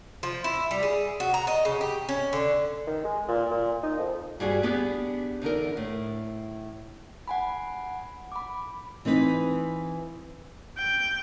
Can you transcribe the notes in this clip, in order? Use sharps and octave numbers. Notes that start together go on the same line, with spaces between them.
F3
E4
G3
G#4
F#4
A#5
D#5
C#3
G4
C#4
D3
D#3
G#3
A#2
A#2
D#4
F2
G2 G3 F#4 G#4
B3 D4 G4 G#4
E2 D3 D#4 A#4
A2
F#5 G#5 B5
B5 D6
E3 C4 D#4 B4
G5